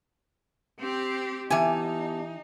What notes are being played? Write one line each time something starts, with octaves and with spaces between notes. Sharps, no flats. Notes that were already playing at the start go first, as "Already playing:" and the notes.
C4 G4
E3 B3 D#4 G4 G#5 A5